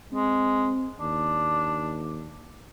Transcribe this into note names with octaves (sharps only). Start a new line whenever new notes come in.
G#3 C4
D#2 D4